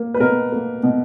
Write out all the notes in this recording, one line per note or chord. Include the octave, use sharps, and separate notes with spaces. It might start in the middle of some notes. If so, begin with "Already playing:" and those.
Already playing: A#3
B4
B2 A#4
A#3
B2